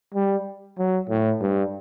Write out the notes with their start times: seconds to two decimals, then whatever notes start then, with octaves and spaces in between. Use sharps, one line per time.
0.15 G3
0.79 F#3
1.10 A2
1.41 G2